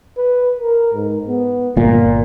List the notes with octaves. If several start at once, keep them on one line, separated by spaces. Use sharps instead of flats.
B4
A#4
G#2
B3
G1 A#2 A#4